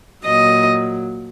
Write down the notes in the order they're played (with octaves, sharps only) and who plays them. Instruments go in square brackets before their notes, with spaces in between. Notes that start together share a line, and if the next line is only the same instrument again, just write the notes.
[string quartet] A#2 F#3 D#5